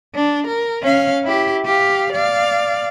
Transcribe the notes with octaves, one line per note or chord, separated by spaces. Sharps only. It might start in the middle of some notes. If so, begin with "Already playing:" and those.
D4
A#4
C#4 F5
E4 G4
G4 F5
D5 F5